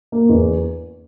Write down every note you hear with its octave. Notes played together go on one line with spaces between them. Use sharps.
A#3
E2